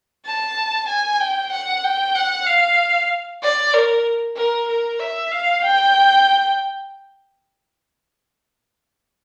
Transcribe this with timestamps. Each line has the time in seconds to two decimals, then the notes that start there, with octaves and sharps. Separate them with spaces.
0.26 A5
0.89 G#5
1.20 G5
1.52 F#5
1.84 G5
2.15 F#5
2.46 F5
3.42 D5
3.74 A#4
4.36 A#4
4.68 A#4
4.99 E5
5.31 F5
5.64 G5